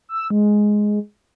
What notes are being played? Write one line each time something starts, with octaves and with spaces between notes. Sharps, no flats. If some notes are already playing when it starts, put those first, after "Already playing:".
E6
G#3